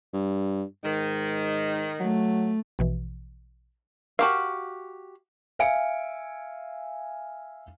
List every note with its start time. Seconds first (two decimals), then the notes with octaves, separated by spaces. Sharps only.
0.13 G2
0.84 G#2 D#3
2.00 F#3 A3
2.79 A#1 B2 E3
4.19 F#4 G4 A#4 F5 A5
5.59 E5 F5 G#5 C#7 D7